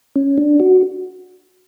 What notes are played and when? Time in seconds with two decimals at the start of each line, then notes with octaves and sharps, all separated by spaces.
0.16 C#4
0.38 D4
0.60 F#4